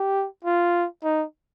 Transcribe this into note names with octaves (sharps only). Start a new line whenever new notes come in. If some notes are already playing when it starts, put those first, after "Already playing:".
Already playing: G4
F4
D#4